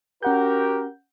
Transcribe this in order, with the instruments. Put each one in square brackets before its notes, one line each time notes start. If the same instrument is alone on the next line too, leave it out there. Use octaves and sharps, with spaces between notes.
[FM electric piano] C#4 F#5 G6 [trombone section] F#4 G4 A#4